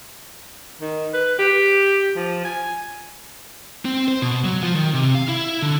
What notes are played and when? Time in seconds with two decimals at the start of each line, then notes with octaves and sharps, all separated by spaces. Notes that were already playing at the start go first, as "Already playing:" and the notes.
0.81 D#3
1.13 B4
1.38 G4
2.16 F3
2.44 G#5
3.85 C4
4.08 C5
4.22 B2
4.45 F#3
4.63 F3
4.75 D#3
4.94 C3
5.15 F5
5.28 E4
5.62 D3